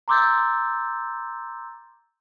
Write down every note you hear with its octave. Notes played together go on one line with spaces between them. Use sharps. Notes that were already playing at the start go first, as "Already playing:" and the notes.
A#5 C6 D6 E6 G6 A6